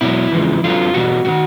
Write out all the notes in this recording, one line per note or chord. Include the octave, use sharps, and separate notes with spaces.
B2 F#3 E4
E2 C#3 F3 G#3
F2 D3 F#3 F4
E2 B2 G3 F#4
C3 D#3 F#4